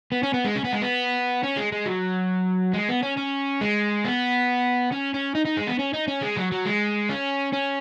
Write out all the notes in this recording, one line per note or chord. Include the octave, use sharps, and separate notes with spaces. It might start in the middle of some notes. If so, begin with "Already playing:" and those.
B3
C#4
B3
G#3
C#4
B3
G#3
B3
C#4
G#3
G#3
F#3
G#3
B3
C#4
C#4
G#3
B3
C#4
C#4
D#4
D#4
G#3
B3
C#4
D#4
C#4
G#3
F#3
F#3
G#3
C#4
C#4